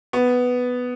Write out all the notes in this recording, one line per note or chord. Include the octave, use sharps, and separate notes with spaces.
B3